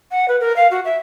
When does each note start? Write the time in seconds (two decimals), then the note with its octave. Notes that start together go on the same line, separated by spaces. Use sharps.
0.11 F#5
0.28 B4
0.40 A#4
0.56 F5
0.71 F#4
0.85 E5